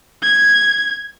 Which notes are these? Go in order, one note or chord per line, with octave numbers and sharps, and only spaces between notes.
G#6